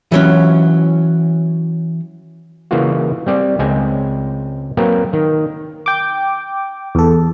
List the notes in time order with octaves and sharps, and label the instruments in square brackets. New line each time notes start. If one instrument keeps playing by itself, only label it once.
[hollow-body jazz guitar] E3 F#3 C#4
[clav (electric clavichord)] C#3 E3 A#3 F4 F#4
G3 C4 D5
C#2 G#3 C4 G#5
F#3 A#3 C4 A#4 B4
D#3
[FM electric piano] G5 D6
E2 A4